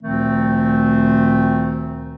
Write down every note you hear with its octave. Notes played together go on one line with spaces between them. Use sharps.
D2 A#2 D#3 F3 A3 C4